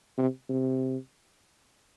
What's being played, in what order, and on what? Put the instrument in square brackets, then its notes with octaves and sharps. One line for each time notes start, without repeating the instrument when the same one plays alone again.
[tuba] C3
C3